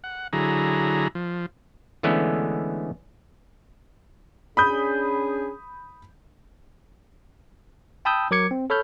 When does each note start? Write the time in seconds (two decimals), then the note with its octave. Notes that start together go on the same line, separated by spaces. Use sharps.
0.04 F#5
0.33 D3 F#3 E4 G#4 A#5
1.15 F3
2.03 D3 E3 G#3 A3 B3 C#4
4.57 C#4 D4 G#4 B5 D#6 G6
8.05 G5 A5 B5 D#6 E6 G6
8.31 F#3 A#4 D6 G#6 C#7
8.51 C4
8.70 A4 C#5 B5 F6 G6